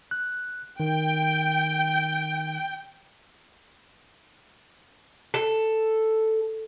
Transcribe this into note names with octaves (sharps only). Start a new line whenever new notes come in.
F#6
D#3 G5
A4